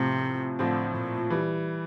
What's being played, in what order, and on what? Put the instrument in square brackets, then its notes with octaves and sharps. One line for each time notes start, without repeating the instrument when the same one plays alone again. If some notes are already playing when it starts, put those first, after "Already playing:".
Already playing: [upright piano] A2 F3 C4 [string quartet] C3
[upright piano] A2 F3 C4 [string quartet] D3
[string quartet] A#2
[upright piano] E3 G3